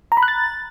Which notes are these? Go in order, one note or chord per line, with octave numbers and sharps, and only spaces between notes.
A#5
B5
F#6
A6